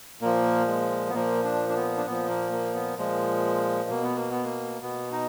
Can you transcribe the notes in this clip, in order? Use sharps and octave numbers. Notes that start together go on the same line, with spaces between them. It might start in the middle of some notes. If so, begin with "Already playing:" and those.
A#2 F3 A#3
G#3
B3
A#2 F3 A#3
D4
D4
B3
D4
A#2 F3 B3
A#3
A#3
B3
A#2 F3 G#3
B2 A#3
B3
A#3
B3
A#3
B2 B3
D#4